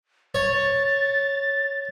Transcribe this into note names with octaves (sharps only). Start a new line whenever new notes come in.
C#5 A6